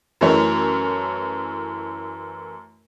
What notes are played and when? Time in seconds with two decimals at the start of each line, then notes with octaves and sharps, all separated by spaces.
0.21 F#2 E3 A3 A#4 C#5